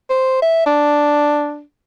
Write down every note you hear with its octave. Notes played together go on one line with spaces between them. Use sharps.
C5
E5
D4